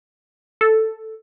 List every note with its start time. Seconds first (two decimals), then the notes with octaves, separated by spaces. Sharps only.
0.61 A4